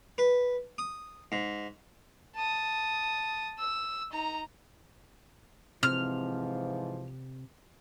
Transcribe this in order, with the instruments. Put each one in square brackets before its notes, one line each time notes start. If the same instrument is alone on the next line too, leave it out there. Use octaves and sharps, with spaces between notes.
[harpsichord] B4
D#6
G#2
[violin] A5 D#6
E6
D#4 A#5
[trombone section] G#2 E3 F3 [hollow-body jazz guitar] C3 [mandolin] F6